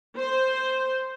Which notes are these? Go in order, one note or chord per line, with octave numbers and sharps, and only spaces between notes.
C5